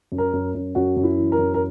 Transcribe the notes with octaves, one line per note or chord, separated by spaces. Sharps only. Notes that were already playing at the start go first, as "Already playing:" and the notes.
F#2
A#4
F#2
F#2
F#2 F#4
F#2
E4
E3
A#4
F#2
A#4